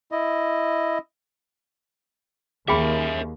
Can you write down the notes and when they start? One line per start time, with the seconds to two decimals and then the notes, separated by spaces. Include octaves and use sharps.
0.12 E4 D#5
2.68 D#2 G#4 A#4 E5 G5 B5